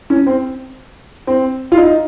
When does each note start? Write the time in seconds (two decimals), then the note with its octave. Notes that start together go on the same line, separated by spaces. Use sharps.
0.10 C#4
0.27 C4
1.27 C4
1.72 F4
1.77 D#4